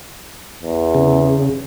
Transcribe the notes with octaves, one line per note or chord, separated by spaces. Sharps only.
E2
C#3